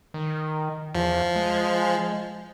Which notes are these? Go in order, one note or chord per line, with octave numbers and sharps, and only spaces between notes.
D#3
E2 F3
G#3